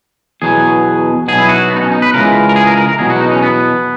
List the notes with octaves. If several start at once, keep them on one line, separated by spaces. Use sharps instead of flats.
E2 B2 F#3 G#4
B1 B2 F#3 G#4
E4
F#4
B3
D#4
C#4
D#4
B4
C#2 C#3 E3 G#3 A#4
A#4
G#4
A#4
A#4
A#4
E2 B2 F#3 G#4
F#4
D#4
C#4
B3